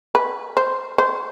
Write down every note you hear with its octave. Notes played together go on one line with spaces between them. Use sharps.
B4
C5
C5